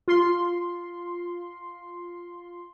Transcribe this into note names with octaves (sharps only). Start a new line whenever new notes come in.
F4 C6